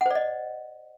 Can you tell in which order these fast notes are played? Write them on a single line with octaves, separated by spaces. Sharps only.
F#5 C5 D5 D#5